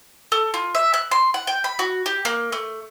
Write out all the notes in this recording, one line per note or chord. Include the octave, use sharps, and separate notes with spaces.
A4
F4
E5
F#6
C6
F#5
G5
B5
F#4
G4
A#3
A3